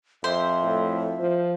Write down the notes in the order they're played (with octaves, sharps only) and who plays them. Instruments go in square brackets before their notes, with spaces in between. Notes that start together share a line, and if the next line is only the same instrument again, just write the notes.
[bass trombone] F2 [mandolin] C5 C6 [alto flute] E5
[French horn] A2
F3